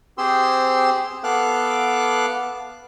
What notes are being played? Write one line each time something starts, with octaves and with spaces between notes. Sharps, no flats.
C4 G4 G#4 C5 C6 E6
B3 A4 F5 D6 F#6